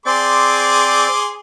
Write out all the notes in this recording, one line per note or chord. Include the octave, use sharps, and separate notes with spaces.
C4 G#4 C5 D5 C6 D6